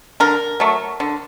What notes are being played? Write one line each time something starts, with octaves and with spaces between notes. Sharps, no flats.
D3 A#4
F#3 A3
D3